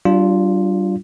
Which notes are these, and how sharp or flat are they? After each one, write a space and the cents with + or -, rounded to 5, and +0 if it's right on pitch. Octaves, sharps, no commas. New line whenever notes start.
G3 -35 D4 +0 F4 +0